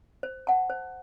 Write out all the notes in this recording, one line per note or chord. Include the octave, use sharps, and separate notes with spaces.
C5
F#5 A5
C5